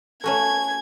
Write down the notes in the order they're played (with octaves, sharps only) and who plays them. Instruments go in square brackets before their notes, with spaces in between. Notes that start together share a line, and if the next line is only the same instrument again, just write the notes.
[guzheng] A3 C#4 F#4 [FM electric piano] A4 C#5 [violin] G#6